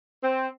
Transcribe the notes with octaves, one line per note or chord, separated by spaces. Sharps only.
C4